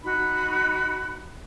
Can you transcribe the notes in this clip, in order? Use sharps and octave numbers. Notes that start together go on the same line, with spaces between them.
D#4 F#4 B5